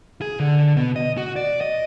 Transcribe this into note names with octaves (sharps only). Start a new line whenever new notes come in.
G#4
D3
B2
D#5
F#4
D5
D#5